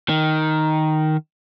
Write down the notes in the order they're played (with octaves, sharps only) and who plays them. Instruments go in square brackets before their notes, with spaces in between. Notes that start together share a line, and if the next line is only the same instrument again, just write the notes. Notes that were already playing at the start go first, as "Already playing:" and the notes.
[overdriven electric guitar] D#3